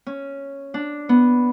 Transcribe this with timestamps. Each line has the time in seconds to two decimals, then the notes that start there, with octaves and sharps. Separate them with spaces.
0.07 C#4
0.74 D4
1.09 B3